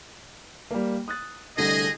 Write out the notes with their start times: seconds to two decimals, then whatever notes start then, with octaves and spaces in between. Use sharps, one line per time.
0.71 G3 A#3
1.08 D#6 F#6 A6
1.57 C2 D3 A3 G#4 D#5